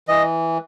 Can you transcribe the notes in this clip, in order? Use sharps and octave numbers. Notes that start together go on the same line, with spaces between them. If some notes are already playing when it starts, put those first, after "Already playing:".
E3 D#5